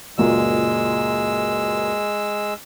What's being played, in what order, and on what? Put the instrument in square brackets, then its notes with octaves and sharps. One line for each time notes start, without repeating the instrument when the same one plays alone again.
[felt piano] C#2 F#2 A#2 [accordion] G#3 E6